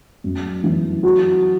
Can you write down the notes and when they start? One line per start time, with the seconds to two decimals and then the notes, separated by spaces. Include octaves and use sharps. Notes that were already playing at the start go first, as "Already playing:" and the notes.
0.24 F#2
0.64 E3
1.03 F#4